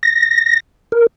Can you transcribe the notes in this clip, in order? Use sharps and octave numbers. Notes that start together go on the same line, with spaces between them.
A#6
A#4